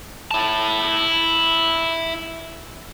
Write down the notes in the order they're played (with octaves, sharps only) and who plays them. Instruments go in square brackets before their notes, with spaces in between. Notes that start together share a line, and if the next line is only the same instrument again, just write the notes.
[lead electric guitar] E4 A5